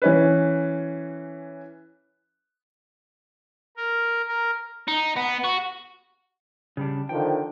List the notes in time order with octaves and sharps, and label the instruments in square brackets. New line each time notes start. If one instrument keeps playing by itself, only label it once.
[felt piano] E3 C#4 B4
[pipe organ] A#4
A#4
[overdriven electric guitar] D#4
B3
F#4
[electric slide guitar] C#3 G3 D4
[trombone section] D3 D#3 F3 [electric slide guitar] G5